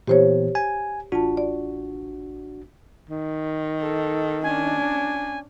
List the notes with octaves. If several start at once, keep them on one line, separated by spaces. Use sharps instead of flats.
A#2 E3 B3 G4 C5 C#5
G#5
A1 D4 F4 F#4 A5
D5
D#3
A4
C#4 D4 G#5